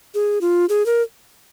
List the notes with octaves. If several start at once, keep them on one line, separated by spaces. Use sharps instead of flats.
G#4
F4
G#4
A#4